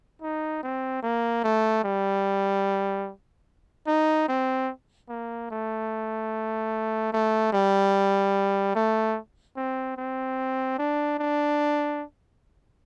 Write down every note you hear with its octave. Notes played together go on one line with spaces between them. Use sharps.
D#4
C4
A#3
A3
G3
D#4
C4
A#3
A3
A3
G3
A3
C4
C4
D4
D4